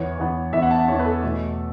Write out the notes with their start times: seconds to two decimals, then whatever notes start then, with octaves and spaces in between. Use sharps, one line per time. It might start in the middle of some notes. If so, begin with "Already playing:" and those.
Already playing: E2 E3 B3 C#5
0.18 E2 E3 B3
0.53 E2 E3 B3 E5
0.62 F#5
0.71 A5
0.79 F#5
0.88 E2 E3 B3 C#5
0.99 B4
1.06 A4
1.22 E2 B2 A3